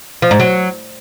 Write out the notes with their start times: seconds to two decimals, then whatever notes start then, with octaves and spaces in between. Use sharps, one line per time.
0.22 F3
0.31 G#2
0.40 F#3